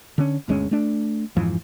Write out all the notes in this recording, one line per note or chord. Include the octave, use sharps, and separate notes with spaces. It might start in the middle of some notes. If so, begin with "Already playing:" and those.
D3 C#4
G1 D2 G#3 C#4
A3 D4
F2 G#2 E3 F3